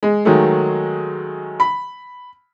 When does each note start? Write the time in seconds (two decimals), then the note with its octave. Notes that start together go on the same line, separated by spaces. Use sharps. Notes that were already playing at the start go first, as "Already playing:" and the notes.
0.03 G#3
0.25 D#3 F#3 G#3 A3
1.60 B5